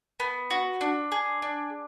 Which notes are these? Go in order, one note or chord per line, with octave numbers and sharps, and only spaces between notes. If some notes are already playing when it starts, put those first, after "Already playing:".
B3
F#4
D4
G#4
D4